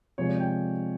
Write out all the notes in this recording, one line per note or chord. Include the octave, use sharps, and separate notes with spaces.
C3 F3 G#3 B3 C#5
D5
G5